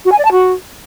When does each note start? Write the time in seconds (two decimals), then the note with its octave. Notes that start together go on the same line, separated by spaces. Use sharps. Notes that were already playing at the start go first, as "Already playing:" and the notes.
0.05 F#4
0.12 G#5
0.18 D5
0.25 A5
0.32 F#4